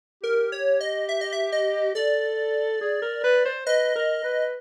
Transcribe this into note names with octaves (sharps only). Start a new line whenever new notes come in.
G4 A#4
C#5
D#5
E5
D#5
E5
D#5
A4 D5
G#4
A#4
B4
C5
B4 D#5
A#4
B4